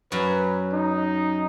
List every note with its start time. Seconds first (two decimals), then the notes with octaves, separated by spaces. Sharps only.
0.12 F#2 F#3 B4
0.73 D#4